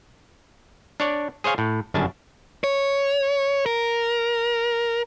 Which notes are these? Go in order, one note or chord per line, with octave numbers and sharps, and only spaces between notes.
D4 C#5 D5
G#4 C5 C#5 F5 G#5
A2
G1 F#2 C#3 D4 G#5 A5
C#5
A#4